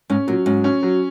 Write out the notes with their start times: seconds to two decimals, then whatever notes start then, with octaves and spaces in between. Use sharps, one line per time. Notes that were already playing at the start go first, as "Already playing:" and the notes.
0.10 G#2 C#4
0.28 A#2 F#3
0.46 G#2 C#4
0.64 C#4
0.82 F#3